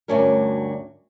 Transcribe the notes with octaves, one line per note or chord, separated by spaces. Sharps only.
D2 G2 F#3 C#4 D4 A#4